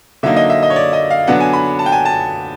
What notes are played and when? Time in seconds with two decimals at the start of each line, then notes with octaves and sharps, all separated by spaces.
0.23 D3 F#3 A#3 D#4 E5
0.37 D#5
0.50 E5
0.63 D#5
0.70 C#5
0.76 D5
0.93 D#5
1.11 F5
1.27 D3 F#3 B3 D4 F#5
1.40 G#5
1.53 B5
1.79 A5
1.86 G5
1.92 G#5
2.05 A5